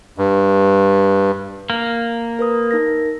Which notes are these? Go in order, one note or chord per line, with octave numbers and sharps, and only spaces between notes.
G2
A#3
A#4 B4 D#6
D#4 A#4 A#6